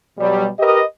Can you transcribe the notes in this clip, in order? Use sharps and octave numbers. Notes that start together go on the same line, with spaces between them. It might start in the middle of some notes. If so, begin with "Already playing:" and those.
B2 F#3 G3
G4 A#4 B4 D#5